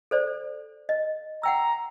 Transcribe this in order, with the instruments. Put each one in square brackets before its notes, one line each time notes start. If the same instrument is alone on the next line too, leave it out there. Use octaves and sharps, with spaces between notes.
[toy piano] A4 C5 D5
D#5
[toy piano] F#5 G5 E6 [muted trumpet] A#5